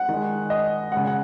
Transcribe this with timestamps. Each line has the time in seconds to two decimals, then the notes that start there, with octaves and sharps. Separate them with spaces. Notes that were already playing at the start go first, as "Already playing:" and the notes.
Already playing: F#5
0.09 D#3 G#3
0.50 D#5
0.92 C#3 G#3 F#5
1.07 F#5